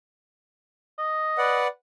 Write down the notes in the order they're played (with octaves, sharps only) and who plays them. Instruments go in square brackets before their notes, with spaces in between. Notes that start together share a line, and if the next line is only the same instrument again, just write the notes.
[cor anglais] D#5
[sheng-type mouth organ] B4 D5 F#5